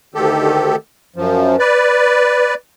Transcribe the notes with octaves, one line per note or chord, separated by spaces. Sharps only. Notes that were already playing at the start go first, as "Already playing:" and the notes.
D2 D#3 G4 A4
F#2 F3
B4 D5